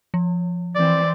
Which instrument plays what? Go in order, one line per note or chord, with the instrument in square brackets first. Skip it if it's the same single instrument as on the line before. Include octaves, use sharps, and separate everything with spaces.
[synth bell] F3
[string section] E3 C4 [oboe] D5